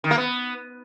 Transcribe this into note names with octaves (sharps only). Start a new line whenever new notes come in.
D#3
A#3
B3